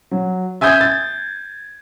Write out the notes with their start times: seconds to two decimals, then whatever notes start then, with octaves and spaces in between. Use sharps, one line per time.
0.11 F#3
0.61 E5 G#5 D#6 G6 G#6
0.81 A6